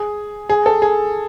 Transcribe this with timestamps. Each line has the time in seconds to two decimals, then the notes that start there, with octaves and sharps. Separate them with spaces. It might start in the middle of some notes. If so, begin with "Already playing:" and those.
Already playing: G#4
0.49 G#4
0.66 A4
0.82 G#4